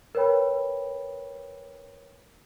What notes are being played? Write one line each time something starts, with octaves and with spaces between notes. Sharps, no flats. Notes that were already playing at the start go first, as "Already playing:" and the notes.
A#4 B4 C#5 G5 B5